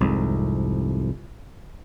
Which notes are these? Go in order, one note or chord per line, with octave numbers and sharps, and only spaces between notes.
C2 F2 G#2